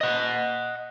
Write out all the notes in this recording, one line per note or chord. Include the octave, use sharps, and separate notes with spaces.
D#5 F#5